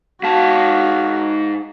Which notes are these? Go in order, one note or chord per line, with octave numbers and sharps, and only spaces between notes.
G#2 F#4 F5 A5